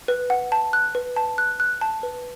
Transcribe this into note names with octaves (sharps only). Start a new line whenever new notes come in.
B4
F#5
A5
F#6
B4
A5
F#6
F#6
A5
B4